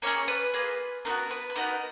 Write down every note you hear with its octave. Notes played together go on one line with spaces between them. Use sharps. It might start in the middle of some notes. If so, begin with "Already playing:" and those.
A#3 C#4 G#4 C#5
B4
A#3 F4 G#4
B3 D#4 F#4 A#4
B4
B4
B3 D#4 F#4 A#4